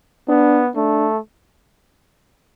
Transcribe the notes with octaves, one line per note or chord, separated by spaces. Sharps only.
B3 D4
A3 D4